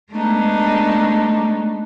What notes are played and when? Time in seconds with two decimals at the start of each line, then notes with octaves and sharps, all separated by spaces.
0.11 G#3 A3 B3 D4 D#4